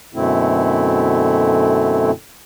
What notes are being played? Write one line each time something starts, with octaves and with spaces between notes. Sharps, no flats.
F#2 B2 D3 A3 C4 E4